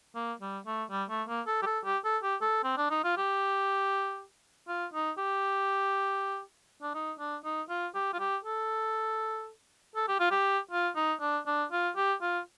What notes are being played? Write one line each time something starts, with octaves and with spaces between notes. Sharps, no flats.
A#3
G3
A3
G3
A3
A#3
A4
G4
A4
G4
A4
G4
A4
C4
D4
D#4
F4
G4
F4
D#4
G4
D4
D#4
D4
D#4
F4
G4
F4
G4
A4
A4
G4
F4
G4
F4
D#4
D4
D4
F4
G4
F4